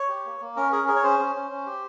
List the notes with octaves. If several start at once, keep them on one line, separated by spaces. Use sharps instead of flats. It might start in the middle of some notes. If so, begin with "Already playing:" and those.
Already playing: C#5
G4
A#3
A#3
C#4 A#4
G#4 A#4
G#4 A#4
C#5
C#4 C5
C#4
C#4
C#4
G4